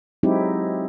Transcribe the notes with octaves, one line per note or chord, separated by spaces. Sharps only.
F#3 G#3 C4 D#4 E4 G4